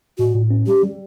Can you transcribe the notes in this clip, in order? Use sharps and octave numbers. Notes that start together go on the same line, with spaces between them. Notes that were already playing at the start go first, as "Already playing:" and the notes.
A2 F#4
A2
C#4
G3 G4
G3